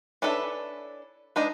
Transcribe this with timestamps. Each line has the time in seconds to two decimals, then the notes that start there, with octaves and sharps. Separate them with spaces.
0.22 C#4 D4 E4 A4 B4
1.36 G#3 D4 D#4 B4